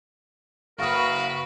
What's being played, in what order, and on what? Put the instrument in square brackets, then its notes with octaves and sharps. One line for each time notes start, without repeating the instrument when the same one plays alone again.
[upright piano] F#1 D#6 [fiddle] F#4 B4 [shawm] A#4 [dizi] F5